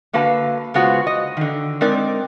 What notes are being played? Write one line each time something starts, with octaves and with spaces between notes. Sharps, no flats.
D3 A#3 F#4 B4 F5 A5
C#3 G#3 B3 F4 F#4 C5
D#5
D3 D#3
G#3 C4 D#4 A#4 D5